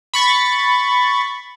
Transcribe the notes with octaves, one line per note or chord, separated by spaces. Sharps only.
B5 C#6 A6